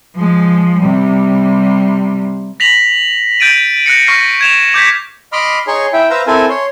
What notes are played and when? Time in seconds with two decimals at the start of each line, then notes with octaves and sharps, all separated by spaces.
0.15 F3 G#3
0.79 C3 G3
2.60 A#6 B6 F7 F#7
3.40 G6 A6 D7 D#7
3.86 F#6 A#6 C#7
4.07 C#6 F6 A#6 C7
4.41 G#6 E7 F7
4.74 D6 G6 G#6 B6
5.33 D#5 B5 C6 D6 F6
5.67 D#4 G#4 C#5 C6 C#6
5.93 E4 E5 G5
6.10 B4 C5 E5 F5 A#5 E6
6.27 C4 E4 A4 A#4 G#5
6.49 C#5 C6